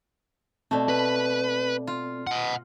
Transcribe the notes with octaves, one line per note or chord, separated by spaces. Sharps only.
B2 A3 C4 A4 D5
B4
F4
D#5 F#5